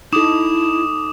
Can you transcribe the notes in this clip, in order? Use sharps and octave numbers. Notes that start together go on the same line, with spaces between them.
D#4 E4 A4 D6 D#6 E7